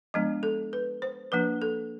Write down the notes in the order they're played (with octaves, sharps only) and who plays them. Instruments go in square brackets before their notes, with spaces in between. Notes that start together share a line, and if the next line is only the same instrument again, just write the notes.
[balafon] F3 G#3 B3 D4 D#5
A4
B4
C5
F3 A#3 D4 B4
A4